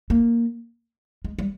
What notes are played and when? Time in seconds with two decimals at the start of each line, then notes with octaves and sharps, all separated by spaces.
0.10 A#3
1.24 G#3
1.39 G3